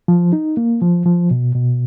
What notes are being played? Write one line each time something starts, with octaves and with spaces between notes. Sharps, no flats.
F3
D#4
A#3
F3
F3
B2
B2